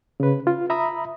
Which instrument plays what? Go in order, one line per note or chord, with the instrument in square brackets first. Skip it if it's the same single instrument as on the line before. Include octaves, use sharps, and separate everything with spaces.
[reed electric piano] C#3 B4
F4
E5 A#5 B5 D#6